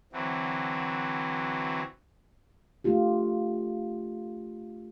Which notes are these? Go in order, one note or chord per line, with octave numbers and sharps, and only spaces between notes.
D3 E3 F#3 C4
A3 D4 F4 G4